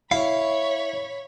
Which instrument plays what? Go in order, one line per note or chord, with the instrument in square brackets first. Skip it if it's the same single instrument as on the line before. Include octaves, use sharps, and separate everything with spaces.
[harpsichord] E4 [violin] C#5 B5 [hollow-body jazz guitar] F5